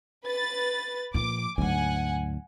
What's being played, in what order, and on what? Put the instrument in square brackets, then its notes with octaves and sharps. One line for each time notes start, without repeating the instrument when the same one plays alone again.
[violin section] B4 A6
[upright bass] A#2 F3 [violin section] D6
[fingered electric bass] D2 [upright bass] G#2 F#3 [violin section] F#5 G#5